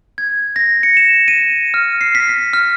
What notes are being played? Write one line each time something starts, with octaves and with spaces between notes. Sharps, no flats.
G#6
A#6
C#7
E7
D#7
F6
C7
B6
B6
F6